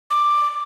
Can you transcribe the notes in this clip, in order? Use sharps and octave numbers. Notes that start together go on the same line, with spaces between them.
D6